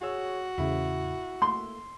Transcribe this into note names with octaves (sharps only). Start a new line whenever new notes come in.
F#4 G#4 C#5 E6
E2 A2 C#3 E4
A3 A#3 C6